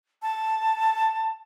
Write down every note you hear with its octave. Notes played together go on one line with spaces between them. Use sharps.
A5